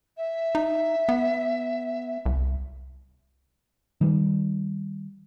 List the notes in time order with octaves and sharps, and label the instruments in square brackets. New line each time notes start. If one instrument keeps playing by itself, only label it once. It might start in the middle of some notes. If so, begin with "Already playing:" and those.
[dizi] E5
[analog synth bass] D#4
B3
C2
[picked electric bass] D#3 G3